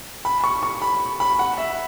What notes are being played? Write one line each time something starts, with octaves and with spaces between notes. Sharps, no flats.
B5
C#6
C#6
B5
B5
F#5
E5